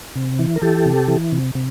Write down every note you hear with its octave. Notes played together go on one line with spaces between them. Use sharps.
C3
E3
A#4
E3 G4 A4
C3
E3
C3
C3